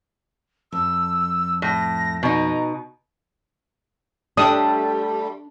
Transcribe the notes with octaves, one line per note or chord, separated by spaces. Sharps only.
F2 E6
A2 A#6
B2 D#4 A#5
G3 A3 D4 D#6